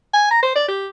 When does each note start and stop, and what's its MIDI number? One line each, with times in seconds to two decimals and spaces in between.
0.14 0.29 80
0.31 0.42 82
0.43 0.54 72
0.56 0.65 74
0.68 0.87 67